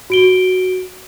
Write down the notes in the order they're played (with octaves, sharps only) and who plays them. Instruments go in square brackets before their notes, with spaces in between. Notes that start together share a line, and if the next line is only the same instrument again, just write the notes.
[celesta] F#4 D7 G7